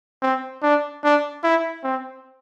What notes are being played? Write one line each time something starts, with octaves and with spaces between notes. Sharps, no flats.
C4
D4
D4
E4
C4